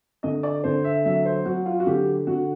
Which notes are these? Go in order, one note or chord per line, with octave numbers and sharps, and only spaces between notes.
D3 D#5
D5
D3 C5
E5
F#3 E5
C5
F#3 F#4
F4
F#4
D3 G4
D3 F#4